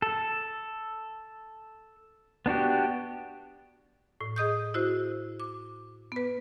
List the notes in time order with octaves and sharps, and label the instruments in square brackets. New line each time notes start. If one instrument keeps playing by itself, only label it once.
[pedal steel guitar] A4
B3 D4 F#4 G4
[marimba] A2
G#4 D#5 D#6 G6
E4 F#4 C5
D6
B3 B4